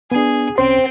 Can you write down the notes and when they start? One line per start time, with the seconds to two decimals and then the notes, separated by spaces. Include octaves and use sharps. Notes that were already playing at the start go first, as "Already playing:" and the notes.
0.12 B3 D4 G#4
0.58 C2 C4 C#4 C5 G5 C6